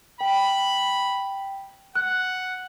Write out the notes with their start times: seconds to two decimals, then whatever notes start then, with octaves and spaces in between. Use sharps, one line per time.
0.21 G5 B5
1.96 F#5 F#6